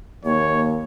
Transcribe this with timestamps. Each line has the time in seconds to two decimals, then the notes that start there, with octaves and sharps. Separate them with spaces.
0.25 D#2 A#3 C#5